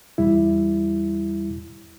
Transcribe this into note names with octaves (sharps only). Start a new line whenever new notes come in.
E2 G3 E4